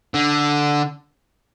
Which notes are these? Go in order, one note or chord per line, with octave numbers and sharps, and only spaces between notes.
D3